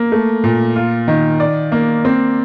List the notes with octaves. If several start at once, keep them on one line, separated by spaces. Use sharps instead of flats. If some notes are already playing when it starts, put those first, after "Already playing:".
Already playing: A#3
A3
A#2
F4
D#3
D5
A#3
C4